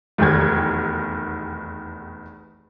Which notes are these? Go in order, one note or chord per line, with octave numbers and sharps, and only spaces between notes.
F1 B1 E2 D#3 G4 G#6